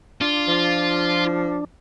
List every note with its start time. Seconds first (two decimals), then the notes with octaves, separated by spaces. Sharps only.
0.21 D4 F4
0.48 F3